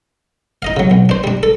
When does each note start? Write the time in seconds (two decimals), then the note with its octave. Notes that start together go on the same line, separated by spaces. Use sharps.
0.62 D#4 D#5 F5
0.77 C#3 F#3
0.91 B1
1.09 D4 C5
1.24 G3 D4
1.43 A4